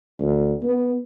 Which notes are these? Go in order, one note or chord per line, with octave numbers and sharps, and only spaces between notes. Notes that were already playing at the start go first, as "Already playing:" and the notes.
D2
B3